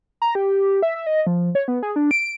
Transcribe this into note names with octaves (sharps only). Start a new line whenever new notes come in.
A#5
G4
E5
E5
D#5
F3
C#5
B3
G#4
D4
D7